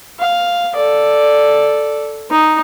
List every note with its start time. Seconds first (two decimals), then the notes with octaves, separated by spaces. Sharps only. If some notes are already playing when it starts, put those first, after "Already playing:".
0.19 F5
0.75 A4 D5
2.31 D#4